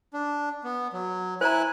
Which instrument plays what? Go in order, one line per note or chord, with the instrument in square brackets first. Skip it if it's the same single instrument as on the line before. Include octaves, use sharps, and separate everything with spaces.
[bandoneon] D4
B3
F#3
[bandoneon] E4 G#5 F#6 [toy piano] C5 A#5